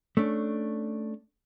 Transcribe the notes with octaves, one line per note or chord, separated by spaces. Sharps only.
A3 C#4 D4